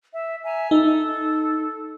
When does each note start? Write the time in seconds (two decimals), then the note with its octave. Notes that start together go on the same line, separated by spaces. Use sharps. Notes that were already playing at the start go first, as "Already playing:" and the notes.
0.13 E5
0.43 E5 G#5 A#5
0.71 D#4 A4